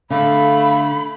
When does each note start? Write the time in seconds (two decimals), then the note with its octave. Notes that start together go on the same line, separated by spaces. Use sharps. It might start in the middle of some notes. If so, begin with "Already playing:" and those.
0.10 D3 A3 F5 B5